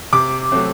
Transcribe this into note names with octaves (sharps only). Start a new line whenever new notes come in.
C3 D6
F#3 A3 C4